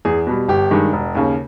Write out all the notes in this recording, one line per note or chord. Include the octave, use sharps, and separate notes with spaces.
E2 G#4
B2 G3
G1 G4
G2 D#3 G#3
E1
D#2 C#3